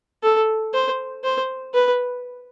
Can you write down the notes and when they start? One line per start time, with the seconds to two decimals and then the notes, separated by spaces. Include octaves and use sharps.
0.23 A4
0.74 C5
1.24 C5
1.74 B4